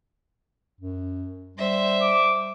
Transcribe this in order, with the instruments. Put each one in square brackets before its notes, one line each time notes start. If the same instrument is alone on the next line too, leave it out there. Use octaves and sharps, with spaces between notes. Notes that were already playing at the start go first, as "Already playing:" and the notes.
[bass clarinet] F#2
[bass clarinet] G3 [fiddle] C5 E5
[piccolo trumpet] D6